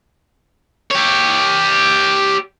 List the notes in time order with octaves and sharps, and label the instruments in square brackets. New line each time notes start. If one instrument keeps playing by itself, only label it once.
[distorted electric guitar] G4 C#5